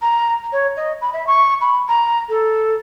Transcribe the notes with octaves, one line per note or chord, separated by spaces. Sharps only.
A#5
C#5
D#5
B5
E5
C#6
B5
A#5
A4